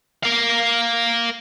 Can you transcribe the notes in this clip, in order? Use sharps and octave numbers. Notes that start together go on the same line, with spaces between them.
A#4 F5